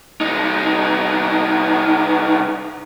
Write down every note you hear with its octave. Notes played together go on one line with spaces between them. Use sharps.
C2 D#4